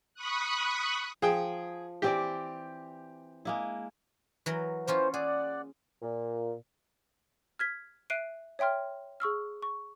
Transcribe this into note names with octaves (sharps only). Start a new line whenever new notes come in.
B5 C#6 D#6 F#6
F3 G#4 G5
E3 C4 G4 D5
G#3 A#3 E4
E3 F#3 A#4
E3 A#3 C#4 F4 C5
G#4 D5 F#5
A#2
F6 G#6 B6
E5 F#6 C7 D7 D#7
C#5 E5 G5 C6 F6
G#4 C#6 E6 F6
C#6